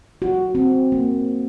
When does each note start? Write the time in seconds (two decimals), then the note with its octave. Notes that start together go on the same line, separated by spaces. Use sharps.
0.22 F#4
0.55 C4
0.92 A#3